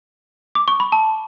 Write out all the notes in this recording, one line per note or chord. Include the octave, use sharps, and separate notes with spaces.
D6
C#6
B5
A5